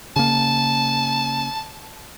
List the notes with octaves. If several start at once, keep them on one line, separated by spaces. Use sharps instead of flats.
C#3 A#3 A5